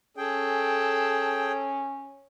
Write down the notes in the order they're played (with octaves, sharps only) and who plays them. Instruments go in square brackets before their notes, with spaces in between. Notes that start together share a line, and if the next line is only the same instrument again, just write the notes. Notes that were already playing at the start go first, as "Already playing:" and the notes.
[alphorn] C#4 [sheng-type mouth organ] G#4 G5 [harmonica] A4